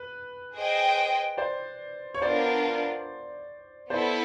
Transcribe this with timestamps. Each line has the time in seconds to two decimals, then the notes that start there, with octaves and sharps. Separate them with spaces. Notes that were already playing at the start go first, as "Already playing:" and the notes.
Already playing: B4
0.54 G#4 C5 D#5 G5
1.37 C5 D5
2.14 C#5
2.22 B3 D4 F4 A#4 C5 D5
3.90 B3 E4 A4 C5 D5